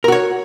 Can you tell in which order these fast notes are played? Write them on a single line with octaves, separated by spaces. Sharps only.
A#4 F#4 C#5